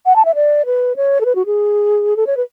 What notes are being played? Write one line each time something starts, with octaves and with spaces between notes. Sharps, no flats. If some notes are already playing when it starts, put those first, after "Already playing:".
F#5
A5
E5
D5
B4
C#5
A4
B4
F#4
G#4
A4
C#5
B4